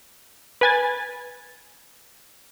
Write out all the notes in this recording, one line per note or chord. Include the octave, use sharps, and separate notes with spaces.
B4 G#5 A6